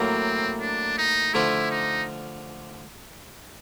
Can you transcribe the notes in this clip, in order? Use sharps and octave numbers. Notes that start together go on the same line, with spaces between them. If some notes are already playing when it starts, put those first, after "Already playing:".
Already playing: A2 F#3 A#3 C4
D4
D#4
D3 F3 A3 D4 E4 F4
D#4